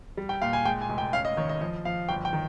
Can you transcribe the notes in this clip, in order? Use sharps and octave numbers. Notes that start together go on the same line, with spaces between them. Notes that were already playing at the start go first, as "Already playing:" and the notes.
G3
G5
A#2 F5
G#5
G#3 G5
G#5
F1
G5
C#4 F5
D#5
D#3 C#5
D#5
F3 D#5
F3 F5
G1 G5
G5
D#3